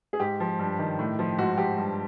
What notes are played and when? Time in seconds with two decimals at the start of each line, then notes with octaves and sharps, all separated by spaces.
0.13 G#4
0.20 G#2 G4
0.40 F3
0.59 G2
0.79 D#3
0.99 A2
1.19 F3
1.38 G#2 F#4
1.57 F3 G4
1.78 G2